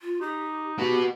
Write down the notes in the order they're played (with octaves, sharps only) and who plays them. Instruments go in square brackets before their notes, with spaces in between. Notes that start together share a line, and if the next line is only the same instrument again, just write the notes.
[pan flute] F4
[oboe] D#4 [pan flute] G4
[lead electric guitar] F#4 B4 [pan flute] G4